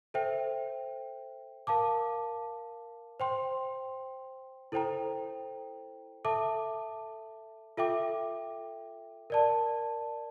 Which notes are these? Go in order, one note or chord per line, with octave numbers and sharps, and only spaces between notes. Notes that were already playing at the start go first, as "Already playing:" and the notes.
A4 C5 E5 G5
A#4 F5 A5 D6
C5 G5 C6
E4 A4 C5 G5 A#5
A4 E5 A5 D6
F4 A4 E5 G5 D6
A#4 D5 A5